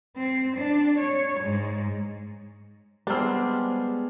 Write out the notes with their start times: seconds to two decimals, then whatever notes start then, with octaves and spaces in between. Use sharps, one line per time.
0.16 C4
0.57 D4
0.99 C#5
1.41 G#2
3.07 G3 G#3 B3 C4 D4 G#4 F6